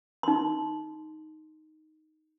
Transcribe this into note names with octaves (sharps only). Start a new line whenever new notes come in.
D#4 C6